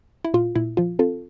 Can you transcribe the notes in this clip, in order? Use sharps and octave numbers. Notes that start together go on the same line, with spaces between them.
E4
A#2 F4
A#2 E4
F3 F4
C4 F4 A4